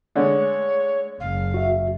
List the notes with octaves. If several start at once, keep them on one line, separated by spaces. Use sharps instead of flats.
D3 G#3 A3 C#5
F#1 F5
F#4 E5